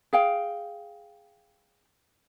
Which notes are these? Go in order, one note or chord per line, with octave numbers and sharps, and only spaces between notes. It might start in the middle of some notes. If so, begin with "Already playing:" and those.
G#4 F5 G5